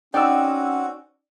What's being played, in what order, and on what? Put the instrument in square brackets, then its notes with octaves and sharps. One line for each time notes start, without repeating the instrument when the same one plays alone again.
[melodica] C4 F#4 F#5 [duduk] C#4 [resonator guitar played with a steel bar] D#4 D5 [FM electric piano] G5 E6